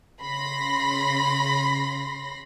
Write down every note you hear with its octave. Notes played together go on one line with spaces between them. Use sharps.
C#3 B5 C6 A#6